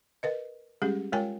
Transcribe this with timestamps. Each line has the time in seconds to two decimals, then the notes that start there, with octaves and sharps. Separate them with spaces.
0.23 A#4 B4 D#5
0.82 G3 G#3 C#4 G4 G#4
1.13 G#3 F4 A#4 C#5 G5 G#5